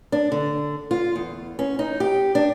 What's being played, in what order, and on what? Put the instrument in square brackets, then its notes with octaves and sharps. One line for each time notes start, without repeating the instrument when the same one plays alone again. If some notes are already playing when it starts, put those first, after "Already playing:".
[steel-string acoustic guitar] D4
D3
F4
E2
C#4
D#4
G4
D4